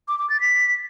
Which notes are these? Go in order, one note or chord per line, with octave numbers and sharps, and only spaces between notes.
D6
D6
A6
B6